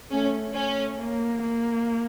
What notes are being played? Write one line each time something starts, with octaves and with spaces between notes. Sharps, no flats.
A3 C#4
A3 C#4
A#3
A#3